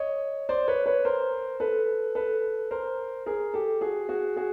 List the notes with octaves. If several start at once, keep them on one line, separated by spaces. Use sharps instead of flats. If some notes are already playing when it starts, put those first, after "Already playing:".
Already playing: C#5 D#5
C5 D5
B4 C#5
B4 C#5
A#4 C5
A4 B4
A4 B4
A#4 C5
G#4 A#4
G4 A4
F#4 G#4
F#4 G#4
F#4 G#4